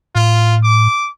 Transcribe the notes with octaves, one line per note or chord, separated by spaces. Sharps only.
A2 F4
D6